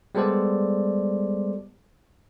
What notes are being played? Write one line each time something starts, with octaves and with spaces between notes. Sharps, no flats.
G3 G#3 B3 A4 C5 D5